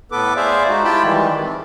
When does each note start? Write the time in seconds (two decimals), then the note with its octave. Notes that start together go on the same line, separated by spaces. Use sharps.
0.12 A2 B3 A4 B4 D6
0.36 G#4 C5 D5 E5 F5
0.68 G#3 D#4 F#4
0.84 E4 F4 G4 G5 A5 B5
1.04 D#3 E3 G3 G#3
1.42 C4